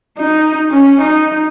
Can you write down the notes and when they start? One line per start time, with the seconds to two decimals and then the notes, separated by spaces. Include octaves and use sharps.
0.17 D#4
0.70 C#4
1.01 D#4